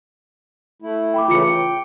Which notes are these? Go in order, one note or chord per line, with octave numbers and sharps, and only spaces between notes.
A3 E4
G5 B5 D6
C#3 E3 A3 F4 D6 C#7
G5